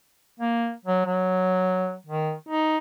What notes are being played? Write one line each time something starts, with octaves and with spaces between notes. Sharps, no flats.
A#3
F#3
F#3
D#3
D#4